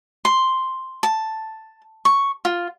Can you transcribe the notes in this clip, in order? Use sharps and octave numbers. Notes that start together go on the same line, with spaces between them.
C6
A5
C#6
F4